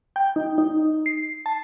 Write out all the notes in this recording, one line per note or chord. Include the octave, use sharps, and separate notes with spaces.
G5
D#4
D#4
C7
A5